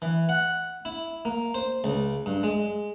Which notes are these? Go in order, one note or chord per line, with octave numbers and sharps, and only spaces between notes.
E3
F#5
E4
A#3
C5
C#2
G2
G#3